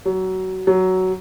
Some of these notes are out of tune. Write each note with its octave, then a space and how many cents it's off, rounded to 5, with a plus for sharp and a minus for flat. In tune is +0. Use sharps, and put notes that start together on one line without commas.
F#3 +20
F#3 +10